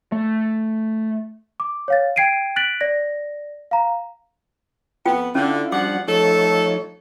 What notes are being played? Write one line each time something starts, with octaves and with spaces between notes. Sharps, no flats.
A3
D6
C#5 F5 A6
G5 G#6 C7 D7 D#7
F#6 A6 B6 D7 F#7
D5 A#6
F5 A#5
F2 B3 F4 G5
D3 C#4 E4 F4
F3 G3 D4 F#4 F#5 D6
F3 A3 D#4 A4 C#5